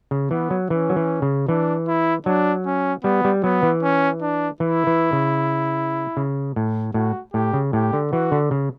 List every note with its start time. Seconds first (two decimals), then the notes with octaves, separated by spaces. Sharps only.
0.11 C#3
0.31 E3 B3
0.51 F#3
0.70 E3 C#4
0.90 F#3
0.96 E3
1.22 C#3
1.48 E3 D4
1.87 E4
2.26 F#3 D4
2.66 C#4
3.04 G3 B3
3.25 G3
3.44 F#3 B3
3.63 E3
3.82 C#4
4.22 D4
4.60 E3 E4
4.87 E3
5.13 C#3
6.17 C#3
6.56 A2
6.94 A2 F#4
7.33 A2 G4
7.54 C#3
7.73 A2 G4
7.93 D3
8.12 E3 F#4
8.32 D3
8.51 C#3